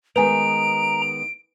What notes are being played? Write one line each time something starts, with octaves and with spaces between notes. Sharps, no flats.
D#3 G#3 B3 B4 G#5 A#5 D7